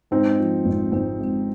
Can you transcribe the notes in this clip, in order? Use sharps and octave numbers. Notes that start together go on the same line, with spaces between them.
G#2 C4 D#4
F3
G#1
G#1 C4
G#2